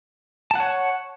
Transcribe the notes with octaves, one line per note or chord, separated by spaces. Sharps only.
C#5 F#5 A5